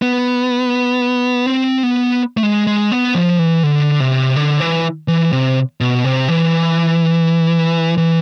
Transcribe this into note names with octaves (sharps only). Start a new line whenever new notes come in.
B3
C4
B3
A3
G#3
G#3
B3
F3
E3
D3
C3
D3
E3
E3
C3
B2
C3
E3
E3